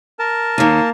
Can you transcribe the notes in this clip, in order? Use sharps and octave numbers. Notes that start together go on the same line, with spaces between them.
A#4 A5
D#2 D#3 A#3